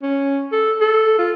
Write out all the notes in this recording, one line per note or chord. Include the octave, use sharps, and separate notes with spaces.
C#4
A4
A4
F4